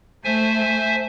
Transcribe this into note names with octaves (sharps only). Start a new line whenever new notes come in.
A3 C5 E5 G#5